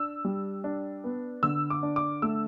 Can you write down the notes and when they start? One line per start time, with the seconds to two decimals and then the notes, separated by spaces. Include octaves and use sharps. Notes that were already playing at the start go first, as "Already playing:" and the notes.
Already playing: D4 E6
0.25 G3
0.64 D4
1.04 B3
1.43 D3 E6
1.70 D6
1.83 D4
1.96 D6
2.22 A3 E6